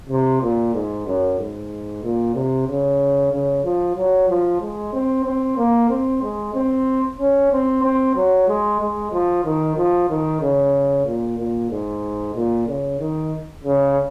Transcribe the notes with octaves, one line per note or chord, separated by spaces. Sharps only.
C3
A#2
G#2
F#2
G#2
A#2
C3
C#3
C#3
F3
F#3
F3
G#3
C4
C4
A#3
C4
G#3
C4
C#4
C4
C4
F#3
G#3
G#3
F3
D#3
F3
D#3
C#3
A#2
A#2
G#2
A#2
C#3
D#3
C#3